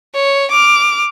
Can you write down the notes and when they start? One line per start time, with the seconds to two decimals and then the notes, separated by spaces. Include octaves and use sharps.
0.14 C#5
0.51 D6 F6